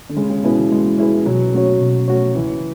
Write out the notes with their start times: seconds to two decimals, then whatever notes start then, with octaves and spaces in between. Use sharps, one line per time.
0.09 D3
0.17 C#3 G#3
0.30 C#3
0.44 B2 C#4 E4 G#4 B4
0.58 E3
0.72 G#3
0.98 C#4 E4 G#4 B4
1.26 B2 F#3
1.54 A3 C#4 F#4 C#5
1.81 B2
2.08 A3 C#4 F#4 C#5
2.35 C#2 E3